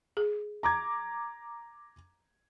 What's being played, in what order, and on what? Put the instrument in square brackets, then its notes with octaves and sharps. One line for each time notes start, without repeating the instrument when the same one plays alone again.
[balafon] G#4
[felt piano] A#5 D6 G#6